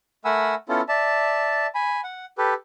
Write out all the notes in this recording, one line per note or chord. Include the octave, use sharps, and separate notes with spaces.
A3 A#4 F#5 G#5 B5 E6
B3 C#4 E4 F4 A4
D5 E5 A5
G#5 B5
F#5
G4 A4 B4